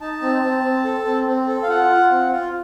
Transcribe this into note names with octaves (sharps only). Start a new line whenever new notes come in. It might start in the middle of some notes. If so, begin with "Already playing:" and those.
D#4 A5
C4
C4
C4
A4
C4
C4
A4
F5
F4 F#5
F4
C4
F4